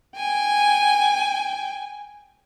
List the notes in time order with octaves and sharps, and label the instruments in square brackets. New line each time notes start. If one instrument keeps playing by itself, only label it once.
[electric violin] G5 [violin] G#5